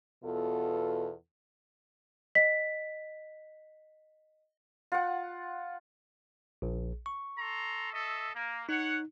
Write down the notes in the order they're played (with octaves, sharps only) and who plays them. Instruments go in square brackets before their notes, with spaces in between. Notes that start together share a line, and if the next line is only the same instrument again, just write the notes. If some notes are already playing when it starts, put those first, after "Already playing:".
[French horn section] E2 B2 F4 A4
[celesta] D#5 B6
[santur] F4 F#5
[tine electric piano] A#1
C#6
[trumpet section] A4 A#5 C6
A4 D#5 E5
A#3
[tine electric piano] D#4 [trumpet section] C#5 F#5